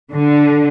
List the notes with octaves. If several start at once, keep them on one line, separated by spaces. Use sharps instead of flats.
D3